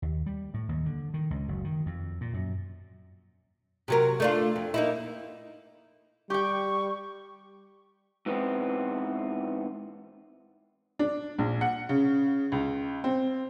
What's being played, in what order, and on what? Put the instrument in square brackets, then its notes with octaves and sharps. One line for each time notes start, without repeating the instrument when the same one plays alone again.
[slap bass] D#2
G3
A2
D#2
D3
D#3
C#2
F#1
D#3
F2
A#2
F#2
[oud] C3 F#3 A#4
A3 D4 F4
F2
A#3 D#4 E4
[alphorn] G3 [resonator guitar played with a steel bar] G4 G5 [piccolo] C#6
[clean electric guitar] G#2 E3 B3 C4
[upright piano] D4
A#1
F#5
C#3
C#2
C4